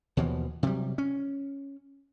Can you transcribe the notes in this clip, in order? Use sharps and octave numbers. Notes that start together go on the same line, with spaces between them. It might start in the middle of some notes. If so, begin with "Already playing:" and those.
D#2 B2 E3 F3
C3 F#3 G3
C#4